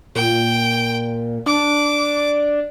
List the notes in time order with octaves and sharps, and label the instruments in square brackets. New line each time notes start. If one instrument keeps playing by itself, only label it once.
[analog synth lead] A#2 [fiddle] G5
[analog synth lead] D4 [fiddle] D6